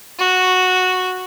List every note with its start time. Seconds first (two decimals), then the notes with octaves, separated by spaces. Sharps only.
0.19 F#4